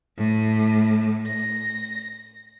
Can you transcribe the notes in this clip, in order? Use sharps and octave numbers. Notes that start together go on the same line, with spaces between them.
A2
A#6